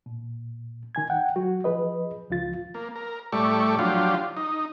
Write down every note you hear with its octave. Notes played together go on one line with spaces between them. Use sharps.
A#2
D#3 G#5 G#6
F#5 G5
F#3 F#4
F3 G#4 B4 D#5
C#2 F3 F4 A6
A#3
A#4
A2 G3 A3 D5 C#6
F3 F#3 D4 F4 G4
D#4